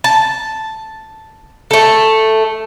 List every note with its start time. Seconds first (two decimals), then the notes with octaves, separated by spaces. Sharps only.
0.04 A5
1.71 A3 A4